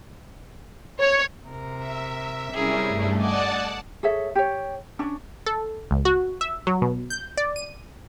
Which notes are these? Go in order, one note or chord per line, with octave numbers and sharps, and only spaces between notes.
C#5
C3 A#4
E5
C3 G3 C#4 E4 G#4 A#4
G2 A3
D5 D#5 F#5 G#5 A5 D6
G#4 A4 C#5 E5
G4 C#5
C#4 D4
A4
C#2
F#4
E5
F#3
B2
G6
D5
D#7